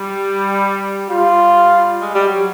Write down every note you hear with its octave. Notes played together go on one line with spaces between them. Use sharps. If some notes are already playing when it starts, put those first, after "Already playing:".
Already playing: G3
G3 F4
G#3
G3
F#3